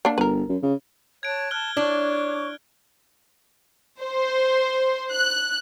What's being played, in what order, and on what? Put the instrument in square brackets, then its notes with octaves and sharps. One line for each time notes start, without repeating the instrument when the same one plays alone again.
[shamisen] A#3 D4
[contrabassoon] G1 [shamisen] A#4 B4
[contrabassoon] F#2
C#3
[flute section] C#5 A5 F#6 [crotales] G#6 D7
[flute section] A5 [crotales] F6 F#6 G7
[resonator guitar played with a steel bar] D4 [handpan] E4 D5 [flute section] C#5 C#6 D6
[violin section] C5
F#6